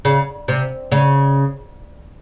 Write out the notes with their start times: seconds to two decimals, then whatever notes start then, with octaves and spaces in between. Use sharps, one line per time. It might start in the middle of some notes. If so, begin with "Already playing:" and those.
0.05 C#3
0.48 C3
0.92 C#3